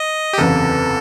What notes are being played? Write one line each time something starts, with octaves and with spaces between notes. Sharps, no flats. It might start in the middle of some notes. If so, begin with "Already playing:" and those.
Already playing: D#5
G4
F#1 E2 C3 A4